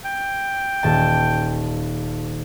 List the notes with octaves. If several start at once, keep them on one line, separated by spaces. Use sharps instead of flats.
G5
D#1 A5